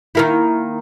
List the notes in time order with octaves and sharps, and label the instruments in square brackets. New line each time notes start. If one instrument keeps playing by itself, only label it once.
[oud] D#3 A#3 E4